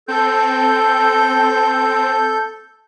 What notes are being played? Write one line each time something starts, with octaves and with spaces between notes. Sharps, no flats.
C4 A4 G6